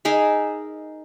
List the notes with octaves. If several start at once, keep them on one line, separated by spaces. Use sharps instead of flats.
D#4 G#4 A#4 E5